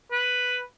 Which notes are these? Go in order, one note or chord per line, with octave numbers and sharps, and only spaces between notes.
B4